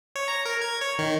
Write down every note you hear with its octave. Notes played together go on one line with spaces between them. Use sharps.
C#5
A#5
A#4
G#6
C#5
D#3